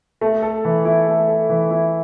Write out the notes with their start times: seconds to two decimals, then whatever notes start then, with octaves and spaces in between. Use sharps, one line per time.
0.21 A3
0.42 A4
0.65 E3
0.85 E4
1.07 A3
1.28 A4
1.49 E3
1.71 E4